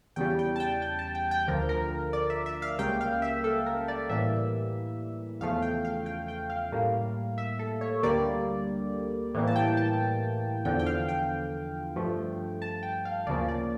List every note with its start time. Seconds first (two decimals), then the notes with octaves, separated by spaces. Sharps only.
0.16 E2 C#3 G3 G5
0.39 G5
0.56 A5
0.60 G5
0.82 G5
0.99 A5
1.15 G5
1.31 G5
1.48 D2 D3 F3 A#4
1.69 A#4
2.13 D5
2.30 E5
2.46 E5
2.62 F5
2.79 C#2 C#3 G3 A#3 G5
3.01 F5
3.22 E5
3.44 A4
3.66 A#4
3.88 D5
4.09 A2 E3 G3 A#3 E5
5.41 E2 C#3 F3 A3 F5
5.62 G5
5.85 F5
6.06 G5
6.28 G5
6.50 F5
6.72 A2 G3 A#3
7.38 E5
7.59 A4
7.81 C#5
8.03 D2 D3 G3 A#3 D5
9.34 A2 E3 G3 A#3
9.47 A5
9.56 G5
9.77 A5
10.65 E2 D3 F3 G5
10.79 G5
10.86 F5
11.08 G5
11.96 G2 F3 A3
12.62 A5
12.83 G5
13.05 F5
13.27 D2 C#3 F3 A#3 D5
13.48 D5